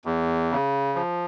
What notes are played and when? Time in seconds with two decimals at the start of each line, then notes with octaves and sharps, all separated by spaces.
0.05 E2
0.51 C#3
0.95 F3